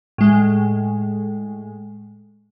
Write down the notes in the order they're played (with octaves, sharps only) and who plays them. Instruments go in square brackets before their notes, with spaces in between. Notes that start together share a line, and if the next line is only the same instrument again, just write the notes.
[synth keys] A2 G#3